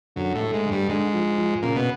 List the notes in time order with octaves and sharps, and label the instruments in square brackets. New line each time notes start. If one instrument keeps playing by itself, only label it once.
[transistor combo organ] F#2 [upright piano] D3
[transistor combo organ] A2
[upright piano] A3
[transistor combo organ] G#2
[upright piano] D3
[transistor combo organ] G2
[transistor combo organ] G#2 [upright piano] D3
[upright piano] F3
F3
[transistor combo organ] A#2 [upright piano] C#3
[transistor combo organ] B2